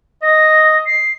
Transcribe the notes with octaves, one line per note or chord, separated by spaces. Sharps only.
D#5 A#6
C7